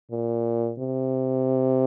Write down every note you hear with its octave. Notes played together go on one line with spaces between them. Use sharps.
A#2
C3